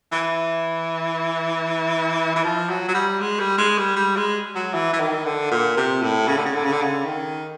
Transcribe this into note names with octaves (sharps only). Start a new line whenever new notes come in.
E3
E3
F3
F#3
F#3
G3
G#3
G3
G#3
G3
G3
G#3
F#3
E3
E3
D#3
D3
A#2
C3
A2
C#3
D3
C#3
D3
C#3
D3
C#3
D#3